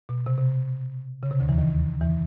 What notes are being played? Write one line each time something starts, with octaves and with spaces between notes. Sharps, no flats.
B2
C3
C3
C#3
C3
D2 D3
E2 E3
D#2 D#3
E2 E3